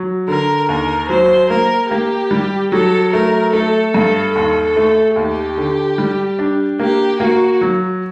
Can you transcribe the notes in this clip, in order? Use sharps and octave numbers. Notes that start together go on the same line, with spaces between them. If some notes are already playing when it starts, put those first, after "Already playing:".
Already playing: F#3
D3 A#4
D#2 A#4
F#3 C5
A#3 A#4
A#3 G4
G3
F#3 A4
A3 A#4
A3 A4
G2 A4
D#2 A4
A3
D#2 G4
D3
G3
D4
A#3 G4
A#3 F#4
F#3